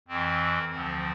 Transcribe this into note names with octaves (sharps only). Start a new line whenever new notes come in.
F2 E3 C4
D2 D3 F3 C4